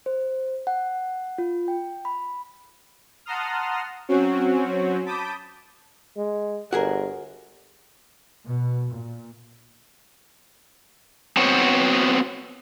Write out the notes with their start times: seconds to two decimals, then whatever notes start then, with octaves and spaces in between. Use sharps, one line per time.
0.06 C5
0.67 F#5
1.38 F4
1.68 G5
2.05 B5
3.26 F#5 A5 A#5 C6 D#6 F6
4.09 F#3 C4 C#4 F#4
5.05 A5 B5 D6 D#6 G6
6.17 G#3
6.73 G1 F#4 G#4 A#4
8.45 B2
8.90 A#2
11.37 B3 C4 F#4 C5 C#5